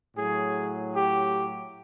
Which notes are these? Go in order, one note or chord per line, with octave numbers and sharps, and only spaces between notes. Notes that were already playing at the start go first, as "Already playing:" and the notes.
A2 F#3 G#4
G4